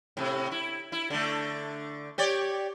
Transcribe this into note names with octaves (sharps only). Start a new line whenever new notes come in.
A2 C3
E4
E4
D3 A3
G4 C#5 D5